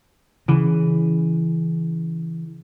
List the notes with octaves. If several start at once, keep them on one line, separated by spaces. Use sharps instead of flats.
C#3 E3